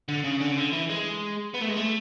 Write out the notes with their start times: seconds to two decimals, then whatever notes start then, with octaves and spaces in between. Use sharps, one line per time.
0.08 D3
0.24 C#3
0.41 D3
0.51 C#3
0.57 D3
0.73 E3
0.90 G#3
1.54 B3
1.61 A3
1.69 G#3
1.77 A3